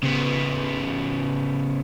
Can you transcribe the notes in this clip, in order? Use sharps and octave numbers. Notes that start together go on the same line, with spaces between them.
C#3 B3